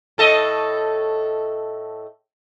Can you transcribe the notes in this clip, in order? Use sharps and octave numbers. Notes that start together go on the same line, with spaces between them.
A2 A4 D#5